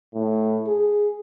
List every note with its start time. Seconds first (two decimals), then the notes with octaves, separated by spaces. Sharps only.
0.14 A2
0.68 G#4